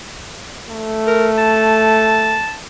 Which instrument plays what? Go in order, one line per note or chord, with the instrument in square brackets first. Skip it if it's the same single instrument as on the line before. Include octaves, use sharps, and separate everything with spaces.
[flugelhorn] A3
[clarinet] A#4
A5